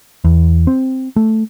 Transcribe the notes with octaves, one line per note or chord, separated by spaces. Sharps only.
E2
C4
A3